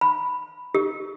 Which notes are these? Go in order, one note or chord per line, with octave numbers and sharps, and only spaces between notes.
B5
G4